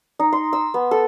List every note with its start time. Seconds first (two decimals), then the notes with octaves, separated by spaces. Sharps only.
0.19 D#4
0.32 C6
0.53 E6
0.74 B3
0.91 A4